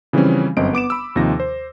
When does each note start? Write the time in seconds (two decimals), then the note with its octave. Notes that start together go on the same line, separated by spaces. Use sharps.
0.13 C#3 E3 F3 G3 C4 C#4
0.57 G1 F#2 C4 D#5 D7
0.73 B3 D6 D7 E7
0.90 B5 E6
1.16 D#2 C3 F3 D#4 A#6
1.40 C5